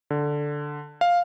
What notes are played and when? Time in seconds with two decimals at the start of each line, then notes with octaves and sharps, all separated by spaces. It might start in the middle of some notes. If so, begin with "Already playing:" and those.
0.10 D3
1.01 F5